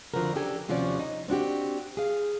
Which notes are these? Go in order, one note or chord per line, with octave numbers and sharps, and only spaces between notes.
F2 D3 F3 B3 F#4 A#4
C#3 D4 G4 A4 G#5
D#2 C3 F3 C#4 F#4 D5
D#4
C4 D4 F#4 G4
G#4 F5